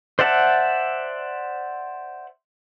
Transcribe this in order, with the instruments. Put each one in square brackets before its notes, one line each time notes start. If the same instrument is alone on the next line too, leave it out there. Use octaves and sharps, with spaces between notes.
[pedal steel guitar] C5 D5 E5 F#5 A5